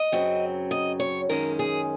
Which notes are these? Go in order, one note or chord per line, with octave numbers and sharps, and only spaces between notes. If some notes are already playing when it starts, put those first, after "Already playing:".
Already playing: D#5
F#2 C#3 F#3 C4
D#5
C#5
F#2 D#3 G#3 C#4 A#4
G#4